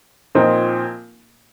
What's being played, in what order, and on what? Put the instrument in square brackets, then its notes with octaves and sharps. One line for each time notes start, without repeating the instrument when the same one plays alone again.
[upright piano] A#2 F3 C4 D#4